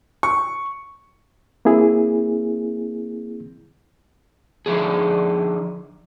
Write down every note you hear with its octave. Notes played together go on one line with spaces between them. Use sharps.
C#6
A#3 C4 E4 G#4
D3 F3 D#4 G#4